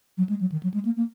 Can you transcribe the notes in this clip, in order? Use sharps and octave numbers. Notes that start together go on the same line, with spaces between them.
F#3
G#3
F#3
D#3
F#3
G#3
A#3
A#3